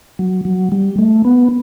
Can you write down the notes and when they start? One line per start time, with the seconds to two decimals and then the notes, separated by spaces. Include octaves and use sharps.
0.19 F#3
0.45 F#3
0.72 G3
0.98 A3
1.25 B3